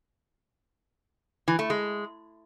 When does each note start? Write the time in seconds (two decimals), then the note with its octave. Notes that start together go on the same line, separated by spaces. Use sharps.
1.48 E3
1.59 A3
1.70 G#3